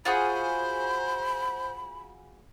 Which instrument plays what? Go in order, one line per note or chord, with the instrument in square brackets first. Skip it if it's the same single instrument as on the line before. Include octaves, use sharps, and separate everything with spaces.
[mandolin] F4 F#4 G#4 [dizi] C5 [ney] B5